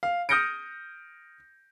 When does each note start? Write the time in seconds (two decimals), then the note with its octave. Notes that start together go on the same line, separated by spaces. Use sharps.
0.03 F5
0.29 D#6 F6 G6 A#6 C#7 D7